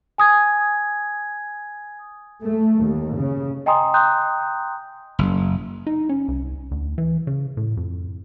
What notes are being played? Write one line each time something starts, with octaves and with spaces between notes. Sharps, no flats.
G#5 D#6 G#6
A3
D#2
C#3
D#5 G5 G#5 A#5 C6 D#6
G5 A#5 C6 D#6 F#6 G6
F#1
D#4
C#4
C2
D2
E3
C#3
A2
F2